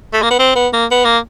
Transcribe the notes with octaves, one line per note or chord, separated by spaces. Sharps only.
A3
A#3
B3
C4
B3
A#3
B3
A#3